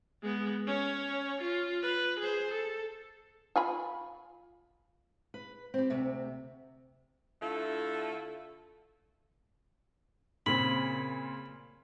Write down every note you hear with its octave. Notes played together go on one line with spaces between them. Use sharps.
G#3 B3
C#4 C#5
F4
B4
G#4 C5
A4
F4 G#5 B5
B4
C4 G4
D2 C3 E5
D3 A3 E4 F4 A4
A#2 C#3 C4 B5